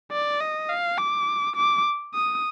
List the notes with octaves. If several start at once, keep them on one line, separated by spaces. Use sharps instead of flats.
D5
D#5
F5
D6
D6
D#6